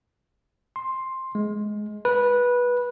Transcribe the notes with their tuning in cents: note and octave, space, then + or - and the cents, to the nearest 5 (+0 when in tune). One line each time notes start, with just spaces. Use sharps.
C6 +10
G#3 +15
B4 -15